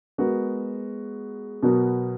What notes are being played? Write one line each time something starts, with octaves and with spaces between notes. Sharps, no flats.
G#3 B3 F#4 A#4
B2 F#3 B3 F#4 A#4